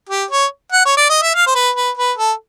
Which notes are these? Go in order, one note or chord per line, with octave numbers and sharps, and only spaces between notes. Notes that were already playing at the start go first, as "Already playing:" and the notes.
G4
C#5
F#5
C#5
D5
D#5
E5
F5
C5
B4
B4
B4
A4